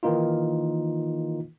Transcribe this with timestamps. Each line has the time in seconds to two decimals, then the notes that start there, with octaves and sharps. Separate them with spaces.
0.03 D#3 E3 A#3 D#4 F4